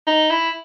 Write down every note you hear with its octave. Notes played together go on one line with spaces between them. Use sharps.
D#4
E4